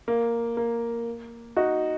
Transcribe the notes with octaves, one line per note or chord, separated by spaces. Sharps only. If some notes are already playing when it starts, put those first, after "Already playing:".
A#3
A#3
D#4 F#4